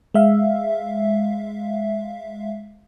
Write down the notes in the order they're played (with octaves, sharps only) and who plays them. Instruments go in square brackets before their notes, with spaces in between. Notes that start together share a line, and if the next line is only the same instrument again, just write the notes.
[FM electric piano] G#3 E5 F5